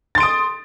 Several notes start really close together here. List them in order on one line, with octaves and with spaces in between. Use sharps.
A6 C6 D7 D#6